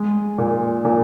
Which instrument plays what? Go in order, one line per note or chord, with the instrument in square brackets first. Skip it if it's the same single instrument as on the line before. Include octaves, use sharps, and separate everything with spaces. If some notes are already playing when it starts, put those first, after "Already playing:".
Already playing: [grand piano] G#3
A#2
A#2